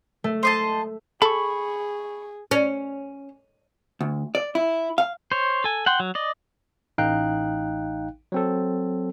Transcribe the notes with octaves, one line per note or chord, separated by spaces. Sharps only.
A3
C5 D#5 A5
G#4 A4 B5 C#6
C#4
D2
D5
E4
F5
C5 C#5
A4 G#5
F#5 G5 C6
F#3
D5 D#5
A1 D#4 F5 G5 F#6
F#3 C4 A4